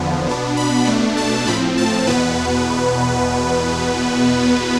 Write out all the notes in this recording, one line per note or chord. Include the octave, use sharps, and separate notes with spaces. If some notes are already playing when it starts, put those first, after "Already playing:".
Already playing: E2 D3 F3 B3
B2 B3 D4
B5
B2 A3 D4
A5
A2 F3 C4 B5
A5
E2 B2 B3 B4